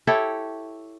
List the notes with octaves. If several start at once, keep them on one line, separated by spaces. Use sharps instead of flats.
E4 G4 A4 C#5